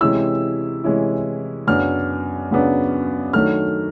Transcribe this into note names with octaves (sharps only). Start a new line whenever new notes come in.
C3 E3 G#3 C#4 E4 E6
C3 E3 G#3 C#4 E4
F#2 C#3 F#3 B3 D4 F6
F#2 C#3 F#3 B3 D4
D#3 F#3 A3 D4 F6